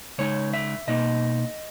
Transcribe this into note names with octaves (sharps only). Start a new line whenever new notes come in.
C#3 G#3 D#4 C#5
E5
B2 A#3 D#4 D#5